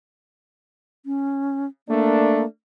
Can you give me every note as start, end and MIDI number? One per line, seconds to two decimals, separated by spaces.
1.06 1.66 61
1.88 2.42 57
1.88 2.45 58
1.88 2.42 62